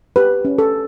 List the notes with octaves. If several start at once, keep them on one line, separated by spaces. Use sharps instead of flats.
G4 B4
C#4
A4